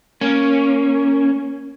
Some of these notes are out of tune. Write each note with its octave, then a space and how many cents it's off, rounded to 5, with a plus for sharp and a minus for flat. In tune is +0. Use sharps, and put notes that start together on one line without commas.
A#3 +0 C#4 +0